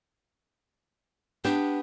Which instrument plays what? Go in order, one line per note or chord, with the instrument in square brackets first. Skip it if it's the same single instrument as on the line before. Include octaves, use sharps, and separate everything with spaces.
[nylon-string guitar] B3 G4 [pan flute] D4